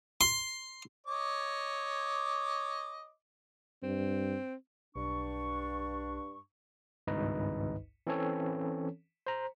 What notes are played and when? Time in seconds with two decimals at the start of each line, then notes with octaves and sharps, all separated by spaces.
0.21 C6
1.07 C#5 D#5 D6
3.83 G2 C4
4.96 B1 G2 D4 C#6
7.07 G#1 C#2 G2 D#4 B4 D#5
8.07 E3 C4 C#4 A4 C#5
9.27 C5 A#5